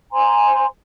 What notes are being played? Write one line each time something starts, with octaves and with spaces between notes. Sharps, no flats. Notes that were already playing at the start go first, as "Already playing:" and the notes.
C5 G#5 A#5 C6